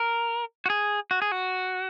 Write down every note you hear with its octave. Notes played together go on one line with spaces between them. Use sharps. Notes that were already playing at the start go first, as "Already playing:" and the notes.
Already playing: A#4
F#4
G#4
F#4
G#4
F#4